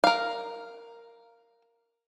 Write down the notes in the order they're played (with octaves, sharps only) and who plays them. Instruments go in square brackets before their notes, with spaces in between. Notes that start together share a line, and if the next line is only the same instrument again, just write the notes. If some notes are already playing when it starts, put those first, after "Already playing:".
[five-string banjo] A#4 F5